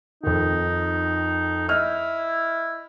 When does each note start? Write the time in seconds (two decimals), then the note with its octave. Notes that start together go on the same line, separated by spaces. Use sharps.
0.23 F2 D#3 D#4
1.69 E4 D#5 F6